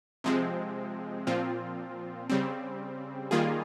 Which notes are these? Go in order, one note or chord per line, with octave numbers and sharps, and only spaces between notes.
C3 F3 G#3 C4
A#2 F3 C4 F4
C#3 G3 C4
D#3 G3 A#3 F4 G#4